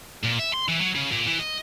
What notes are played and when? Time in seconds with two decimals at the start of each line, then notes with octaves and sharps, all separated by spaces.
0.23 A#2
0.39 E5
0.53 C6
0.68 E3
0.81 F#3
0.95 C#3
1.11 A#2
1.26 E3
1.39 D#5